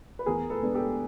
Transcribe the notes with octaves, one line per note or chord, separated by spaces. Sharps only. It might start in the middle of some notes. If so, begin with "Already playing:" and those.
B4
E2 G#4 A#4
A4 B4
B2 G#3 B3 D4
G4 A4